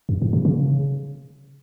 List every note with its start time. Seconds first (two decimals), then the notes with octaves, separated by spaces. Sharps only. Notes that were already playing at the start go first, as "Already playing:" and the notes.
0.09 F#2
0.22 G#2
0.33 B2
0.45 C#3